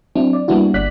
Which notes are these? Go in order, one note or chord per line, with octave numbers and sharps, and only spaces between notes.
F#3 C4 D4 E4
D5
G3 A#3 B3 D4 E4 F#4
G1 D5 F#6 B6